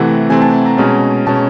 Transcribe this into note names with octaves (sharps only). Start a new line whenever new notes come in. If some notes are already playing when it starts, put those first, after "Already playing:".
Already playing: C3 E3 A3 C4 F#5
C3 E3 A3 C4 G#5
A5
A#5
B2 G#3 C#4
B2 G#3 C#4 A5